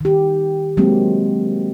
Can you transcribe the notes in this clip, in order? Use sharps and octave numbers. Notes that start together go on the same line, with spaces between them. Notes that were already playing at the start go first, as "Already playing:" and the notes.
D#3 G4
F#3 G#3 A#3 C4 G4